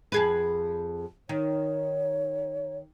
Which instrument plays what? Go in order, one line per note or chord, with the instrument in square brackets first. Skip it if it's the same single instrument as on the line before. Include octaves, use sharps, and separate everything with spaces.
[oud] F2 G#4 B4
[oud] D#3 [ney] C#5